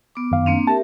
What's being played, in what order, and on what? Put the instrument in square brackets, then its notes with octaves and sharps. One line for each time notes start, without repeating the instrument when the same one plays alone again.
[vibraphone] B3 D6
[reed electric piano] F#2 D#3 F5
[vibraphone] A#3 C4 D4
[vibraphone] G4 A#4 E5 [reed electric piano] A5